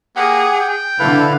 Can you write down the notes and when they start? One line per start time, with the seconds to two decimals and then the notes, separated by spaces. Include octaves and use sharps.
0.16 A#3 G4 G#4 F#5
0.60 G5
0.99 D3 E4 A4 B4 F5